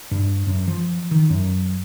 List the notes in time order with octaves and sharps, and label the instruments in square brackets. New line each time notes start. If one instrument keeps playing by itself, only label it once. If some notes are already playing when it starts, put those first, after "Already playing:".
[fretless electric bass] G2
F#2
F3
D#3
F#2